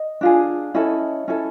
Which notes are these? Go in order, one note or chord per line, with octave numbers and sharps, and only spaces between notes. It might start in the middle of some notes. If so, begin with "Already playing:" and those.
Already playing: D#5
D4 F4 G#4
C#4 E4 A4 D#5
C#4 E4 A4